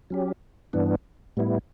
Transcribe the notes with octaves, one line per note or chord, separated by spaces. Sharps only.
F#3 C#4 G4
G2 E3 B3 D4
A2 G3 B3 E4